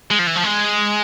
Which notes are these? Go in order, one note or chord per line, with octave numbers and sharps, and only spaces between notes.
G#3
F3
E3
F3
G#3